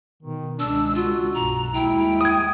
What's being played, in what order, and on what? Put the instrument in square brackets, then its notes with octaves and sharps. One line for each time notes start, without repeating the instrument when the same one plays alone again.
[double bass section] B2 [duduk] D#3
[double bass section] C#2 D#3 G#3 [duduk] D4 [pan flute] E6
[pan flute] F4 [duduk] F#4
[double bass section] B1 G2 [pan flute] A#5
[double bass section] D#2 G3 G#3 [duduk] E4 [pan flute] G5
[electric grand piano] D#6 G#6